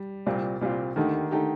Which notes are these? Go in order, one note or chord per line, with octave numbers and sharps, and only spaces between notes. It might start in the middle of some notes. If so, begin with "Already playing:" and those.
Already playing: G3
C2 A#2 G3 C4 F4
C2 A#2 G3 C4 F4
D#2 D3 D#3 A3 D#4 G4
D3 A3 D#4 G4